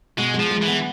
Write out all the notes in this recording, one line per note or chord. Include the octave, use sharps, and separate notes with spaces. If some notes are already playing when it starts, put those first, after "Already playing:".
B2 G#3
G#3
F3
G#3
E3
B3